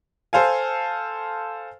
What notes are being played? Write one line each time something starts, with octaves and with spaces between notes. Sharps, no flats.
A4 C5 F5 G#5